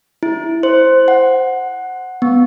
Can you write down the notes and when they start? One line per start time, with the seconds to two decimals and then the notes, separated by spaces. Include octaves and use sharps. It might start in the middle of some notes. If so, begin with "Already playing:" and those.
0.23 E4
0.63 C5
1.08 F#5
2.22 B3